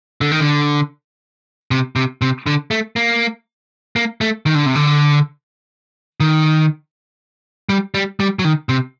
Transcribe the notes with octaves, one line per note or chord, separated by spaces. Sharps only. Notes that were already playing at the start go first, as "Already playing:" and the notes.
D3
D#3
D3
C3
C3
C3
D3
A3
A#3
A#3
A3
D#3
D3
C3
D3
D#3
G3
G3
G3
F#3
D#3
C3